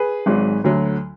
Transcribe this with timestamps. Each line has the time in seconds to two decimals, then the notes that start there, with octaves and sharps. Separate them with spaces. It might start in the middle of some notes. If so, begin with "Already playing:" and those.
Already playing: G#4 B4
0.26 G#1 G#2 F#3
0.64 D2 D3 F#3